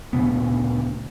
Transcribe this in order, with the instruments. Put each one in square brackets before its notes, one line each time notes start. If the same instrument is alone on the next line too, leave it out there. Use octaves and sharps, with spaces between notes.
[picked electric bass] D2 A#2 C#3 B3